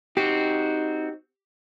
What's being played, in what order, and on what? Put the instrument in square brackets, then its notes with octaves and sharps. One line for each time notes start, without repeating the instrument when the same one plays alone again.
[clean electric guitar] C4 F#4 [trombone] D#4 [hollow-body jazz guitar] G4